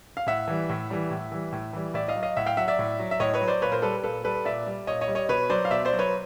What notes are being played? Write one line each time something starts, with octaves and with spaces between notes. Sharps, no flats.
F5
A2 E5 F#5
E3 G3
A2
E3 G3
A2
E3 G3
A2
E3 G3
A2 D5 E5
D#5 F5
F#3
D#5 F5
A2 E5 F#5
F5 G5
F#3 E5 F#5
D5 E5
A2
F#3
E5
A2 C#5 D#5
B4 C#5
F#3
C5 D5
A#2 B4 C#5
A#4 C5
G3 A4 B4
A#2 A4 B4
G3 A4 B4
A#2 D5 E5
G3
A#2 C#5 D#5
C#5 D#5
G3
C#5 D#5
B2 B4 C#5
F#3 C5 D5
F5
B2 D5 E5
C5 D5
F#3
B4 C#5